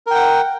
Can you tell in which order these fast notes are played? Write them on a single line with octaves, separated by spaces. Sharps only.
A#4 G5 F#5